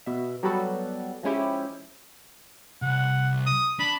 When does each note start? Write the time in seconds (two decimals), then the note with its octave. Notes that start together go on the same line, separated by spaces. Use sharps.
0.06 B2 E5
0.43 F#3 G3 B3 F#4 A4
1.23 F3 G#3 C#4 E4 G4
2.82 C2 F#5
3.47 D#6
3.80 D4 B5